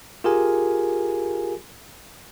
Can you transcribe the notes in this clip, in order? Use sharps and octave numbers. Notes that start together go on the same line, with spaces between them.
F4 G4 G#4 A#4 G#5